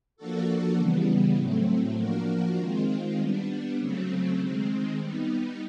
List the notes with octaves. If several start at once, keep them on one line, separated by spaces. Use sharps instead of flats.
F3 A#3 D4 F#4 A4
C#3 E3 G3 B3
A2 F#3 A3 C4
F3 A#3 D4 F#4 A#4
D#3 G#3 C4 F4
G3 B3 D4
C#3 F#3 A3 C4
D#3 G#3 C4
G3 B3 D#4